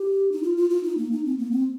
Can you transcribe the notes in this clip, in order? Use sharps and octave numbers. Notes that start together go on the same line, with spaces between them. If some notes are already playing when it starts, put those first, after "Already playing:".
Already playing: G4
D#4
F4
F4
F4
D#4
A#3
D#4
C4
A#3
C4